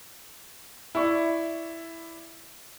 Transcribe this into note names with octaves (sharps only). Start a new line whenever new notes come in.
E4 D5 C#6